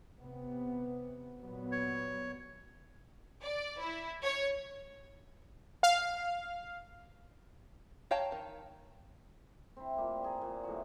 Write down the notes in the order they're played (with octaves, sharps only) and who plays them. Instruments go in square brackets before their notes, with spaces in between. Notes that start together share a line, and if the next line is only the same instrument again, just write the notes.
[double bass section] C3 B3
A#2 F#3 B3
[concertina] C#5
[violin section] D5
E4
C#5
[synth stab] F5
[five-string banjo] C#5 F5 G5 A5 A#5
D#3
[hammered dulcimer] C4 E4
A#2 A#3 G4
G#4 A#5
A#2
A2 C3 F3 F#4